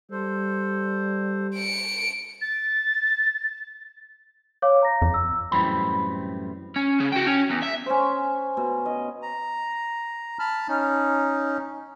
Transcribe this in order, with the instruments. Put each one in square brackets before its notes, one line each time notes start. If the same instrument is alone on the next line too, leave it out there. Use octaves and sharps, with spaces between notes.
[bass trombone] G3 [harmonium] A4 C5
[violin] C#7 D7
[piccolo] A6
[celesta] C#5 F5 D6
A#5 A#6
[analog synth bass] F2
[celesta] E6
[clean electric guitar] F#2 A2 E3 G3 C4 B5
[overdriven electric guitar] C#4
C#3
F#4 G5
C#4
E2
E5
[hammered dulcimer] C#4 C5
B2
D#5
[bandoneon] A#5
A5 B5 F6
C#4 D#4